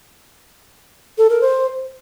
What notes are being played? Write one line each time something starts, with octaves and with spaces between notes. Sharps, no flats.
A4
A#4
C5